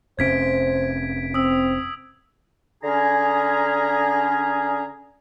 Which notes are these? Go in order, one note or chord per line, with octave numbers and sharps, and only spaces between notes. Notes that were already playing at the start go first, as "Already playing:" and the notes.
F1 C3 C#4 C5 G#6 B6 D7
C4 D#6 E6
D3 C#4 G#4 A#5